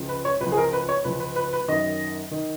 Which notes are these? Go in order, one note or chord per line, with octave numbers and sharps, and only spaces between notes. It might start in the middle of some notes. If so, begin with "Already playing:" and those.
Already playing: C#2 C#3 F3
B4
C#5
C#2 C#3 F3 B4
G#4
A#4
B4
C#5
C#2 C#3 F3 B4
B4
B4
B4
F#2 D#3 D#5
D#3